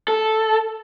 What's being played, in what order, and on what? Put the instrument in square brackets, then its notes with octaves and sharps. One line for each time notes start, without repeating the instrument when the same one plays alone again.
[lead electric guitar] A4